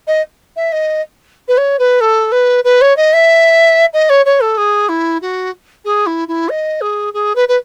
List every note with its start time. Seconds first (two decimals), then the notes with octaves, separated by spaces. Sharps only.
0.07 D#5
0.56 E5
0.72 D#5
1.48 B4
1.57 C#5
1.79 B4
2.01 A4
2.32 B4
2.64 B4
2.81 C#5
2.97 D#5
3.13 E5
3.93 D#5
4.10 C#5
4.26 C#5
4.41 A4
4.57 G#4
4.89 E4
5.22 F#4
5.85 G#4
6.06 E4
6.28 E4
6.49 D#5
6.81 G#4
7.14 G#4
7.36 B4
7.48 B4